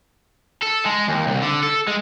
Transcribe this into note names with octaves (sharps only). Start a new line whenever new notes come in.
A4
G#3
D#2
C2
D3
A4
G#3